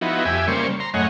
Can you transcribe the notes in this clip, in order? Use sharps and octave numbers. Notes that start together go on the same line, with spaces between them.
F3 B3 D#4 E4 F#4
F2 G4 E5 G#5
C#3 G3 A#3 C5 D5 C#6
A#5 C6
F#2 A2 C#5 D#5 F#5 G#5